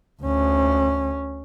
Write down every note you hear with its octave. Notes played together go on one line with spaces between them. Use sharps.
D2 C#4